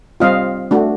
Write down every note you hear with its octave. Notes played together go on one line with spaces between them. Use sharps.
G3 C4 F4 D#5 F5
A3 D4 F#4